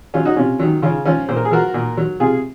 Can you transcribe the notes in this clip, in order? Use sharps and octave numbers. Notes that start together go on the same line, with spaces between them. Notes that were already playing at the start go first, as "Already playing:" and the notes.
F#3 C#4 F4
D#4 F#4
C3 C#4 F4
D#3 F#3
C#3 C#4 F4
F3 C#4 F4
A#2 C5
A#4
G#4
F3 F#4 A#4
A#2
F#3
C3 F4 G#4